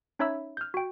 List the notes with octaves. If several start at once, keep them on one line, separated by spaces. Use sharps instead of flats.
C#4 D#4 C#5 E5 B5 E6
F6 G6
F#4 G5